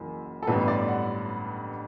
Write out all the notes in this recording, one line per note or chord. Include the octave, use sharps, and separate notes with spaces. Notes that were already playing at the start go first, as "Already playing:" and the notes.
Already playing: F#1 F#2 E3
A4
A1 G2 D3 G3 B3 B4
D5
F#5